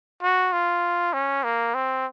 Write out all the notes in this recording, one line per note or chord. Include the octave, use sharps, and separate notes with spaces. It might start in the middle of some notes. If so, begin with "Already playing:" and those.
F#4
F4
C#4
A#3
C4